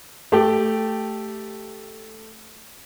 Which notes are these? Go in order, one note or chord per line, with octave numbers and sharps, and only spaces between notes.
A3 G4